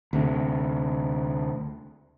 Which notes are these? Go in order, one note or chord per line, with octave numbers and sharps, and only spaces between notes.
D2 C3